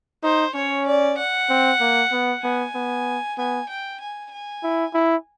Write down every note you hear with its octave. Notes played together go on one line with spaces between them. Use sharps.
D#4 C5
C#4 C#5
D5
F#5
C4
A#3
B3
B3 G#5
B3
B3 G#5
G5
G#5
G#5
E4
E4